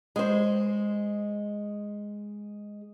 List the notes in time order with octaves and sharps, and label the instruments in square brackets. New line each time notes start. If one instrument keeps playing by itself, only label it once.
[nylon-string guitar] G#3 C5